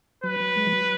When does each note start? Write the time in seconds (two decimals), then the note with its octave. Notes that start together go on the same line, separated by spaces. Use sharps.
0.24 F#3 B4
0.40 F#3
0.56 G#3
0.66 F3
0.72 F#3